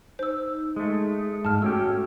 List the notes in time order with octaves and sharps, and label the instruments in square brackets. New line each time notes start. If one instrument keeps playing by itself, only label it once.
[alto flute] D#4 [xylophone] C5 E6
[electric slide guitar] G#3 A3
[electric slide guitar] G#2 [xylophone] A5 F6
[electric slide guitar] A3 C#4 G4 [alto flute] F#4 [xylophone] E6